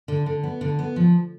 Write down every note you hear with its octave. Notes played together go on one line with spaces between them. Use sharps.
D3
D3
B3
D3
B3
F3